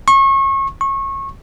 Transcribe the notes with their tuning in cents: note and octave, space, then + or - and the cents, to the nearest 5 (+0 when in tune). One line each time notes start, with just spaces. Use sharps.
C#6 -30
C#6 -25